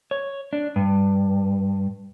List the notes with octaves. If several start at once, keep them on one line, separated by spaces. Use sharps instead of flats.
C#5
D4
G2